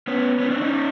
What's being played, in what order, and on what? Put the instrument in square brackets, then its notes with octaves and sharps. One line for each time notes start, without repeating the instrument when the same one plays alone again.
[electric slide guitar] B3 C#4
B3 C#4
C4 D4
C#4 D#4